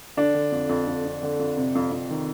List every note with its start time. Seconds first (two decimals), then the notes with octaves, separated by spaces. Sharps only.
0.17 D3 D4
0.35 D3
0.52 F2
0.69 F2
0.87 F2
1.05 F2
1.23 D3
1.39 F2
1.57 C3
1.75 F2
1.92 F2
2.10 D#3